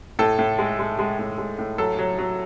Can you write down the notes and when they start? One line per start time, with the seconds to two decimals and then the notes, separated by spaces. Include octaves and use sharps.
0.19 A2 A4
0.39 A2
0.59 G#3
0.79 G#3
0.99 G#3
1.19 A2
1.38 G#3
1.59 A2
1.78 F#3 A4
1.99 F#3
2.19 F#3